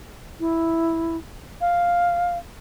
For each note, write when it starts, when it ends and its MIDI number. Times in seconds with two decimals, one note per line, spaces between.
0.40 1.17 64
1.61 2.38 77